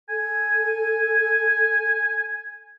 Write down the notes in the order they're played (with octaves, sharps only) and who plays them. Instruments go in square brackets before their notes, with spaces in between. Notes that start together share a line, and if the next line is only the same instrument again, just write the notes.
[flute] A4 [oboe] G#5